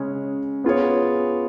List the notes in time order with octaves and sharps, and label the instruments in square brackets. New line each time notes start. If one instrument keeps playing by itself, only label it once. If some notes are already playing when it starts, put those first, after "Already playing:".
Already playing: [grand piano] C#3 G#3 C#4 G#4
B3 F4 G#4 C#5